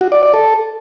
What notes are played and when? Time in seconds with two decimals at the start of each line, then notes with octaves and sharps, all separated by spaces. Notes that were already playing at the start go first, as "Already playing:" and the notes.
0.01 F#4
0.12 D5
0.23 D5
0.34 A4